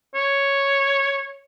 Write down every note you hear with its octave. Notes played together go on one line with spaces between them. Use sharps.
C#5